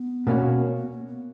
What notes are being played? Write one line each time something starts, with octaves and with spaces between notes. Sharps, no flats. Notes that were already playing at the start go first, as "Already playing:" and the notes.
Already playing: B3
B2 A#3 C#4 F#4
B3
A#3
B3